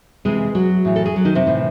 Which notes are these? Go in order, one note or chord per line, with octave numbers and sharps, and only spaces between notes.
C3 E3 G#3 G#4
F#3 F#4
A2 E3
A4
G#4
F#3 F#4
D#3 D#4
C3 C4
A2 E3